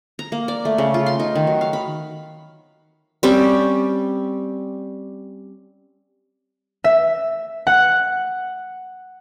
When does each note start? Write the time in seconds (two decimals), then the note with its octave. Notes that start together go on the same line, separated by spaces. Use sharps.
0.19 A#5
0.32 A#3
0.48 D5
0.65 A3
0.78 C#3
0.94 F4
1.06 C6
1.20 D#4
1.35 D#3
1.47 F#3
1.61 F5
1.73 B5
3.23 G3 C4 C#4 G4
6.84 E5
7.67 F#5